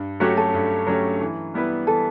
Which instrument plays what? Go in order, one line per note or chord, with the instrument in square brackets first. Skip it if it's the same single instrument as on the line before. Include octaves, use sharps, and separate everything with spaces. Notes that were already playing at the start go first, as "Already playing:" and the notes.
Already playing: [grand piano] G2
[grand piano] F#3 A3 C#4 G4 [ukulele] F#4
[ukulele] A4
[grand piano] G2
F#3 A3 C#4 G4
E3
G3 B3 E4 B4
[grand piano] E3 [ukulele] A4